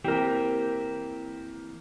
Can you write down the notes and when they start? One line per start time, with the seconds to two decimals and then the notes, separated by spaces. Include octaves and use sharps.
0.04 E3 A#3 C4 G4 A#4